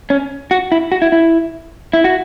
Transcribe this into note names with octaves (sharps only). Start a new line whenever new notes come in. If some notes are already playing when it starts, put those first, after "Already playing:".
C#4
F#4
E4
F#4
E4
E4
E4
F#4